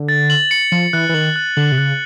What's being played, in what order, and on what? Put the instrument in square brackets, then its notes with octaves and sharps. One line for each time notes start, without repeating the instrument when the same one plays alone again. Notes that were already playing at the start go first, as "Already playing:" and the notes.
Already playing: [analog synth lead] D3
[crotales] A6
F#7
C#7
[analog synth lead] F3 [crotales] C#7
[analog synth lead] E3 [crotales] F#6
[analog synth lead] E3
[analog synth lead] D#3 [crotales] F#7
[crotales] F#6
[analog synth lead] D3 [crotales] F#7
[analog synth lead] C3
[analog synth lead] C#3 [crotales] F#6